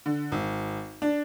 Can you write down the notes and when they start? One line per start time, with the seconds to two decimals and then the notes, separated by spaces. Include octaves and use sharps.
0.06 D3
0.32 G#1
1.02 D4